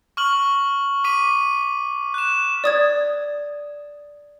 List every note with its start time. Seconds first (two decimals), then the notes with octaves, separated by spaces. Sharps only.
0.17 C#6 F6 F#7
1.04 D6 B6 D#7
2.14 F#6 E7
2.64 D5 D#6 G#6